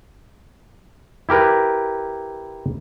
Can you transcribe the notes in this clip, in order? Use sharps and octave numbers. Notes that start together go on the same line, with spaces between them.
E4 G4 A#4 B4